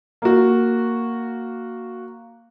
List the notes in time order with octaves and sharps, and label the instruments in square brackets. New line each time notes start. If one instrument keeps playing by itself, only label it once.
[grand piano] A#3 F#4